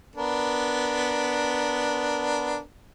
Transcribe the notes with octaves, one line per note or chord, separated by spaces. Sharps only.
B3 D4 A#4